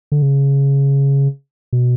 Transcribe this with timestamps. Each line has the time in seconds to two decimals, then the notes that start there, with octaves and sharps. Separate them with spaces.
0.12 D3
0.22 C#3
1.73 B2